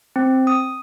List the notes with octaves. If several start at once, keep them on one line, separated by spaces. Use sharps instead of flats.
C4
D#6